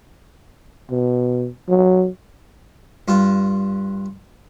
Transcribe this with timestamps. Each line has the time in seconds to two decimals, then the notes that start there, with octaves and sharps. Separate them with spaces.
0.91 B2
1.69 F#3
3.08 G2 F4